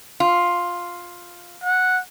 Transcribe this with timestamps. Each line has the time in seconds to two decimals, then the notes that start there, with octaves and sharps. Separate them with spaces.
0.20 F4
1.64 F#5